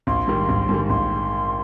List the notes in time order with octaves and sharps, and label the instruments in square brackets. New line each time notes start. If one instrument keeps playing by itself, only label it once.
[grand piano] A#1 [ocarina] C6
[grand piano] G#2 D#3 G3
A#1
G#2 D#3 G3
[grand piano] A#1 [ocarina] C6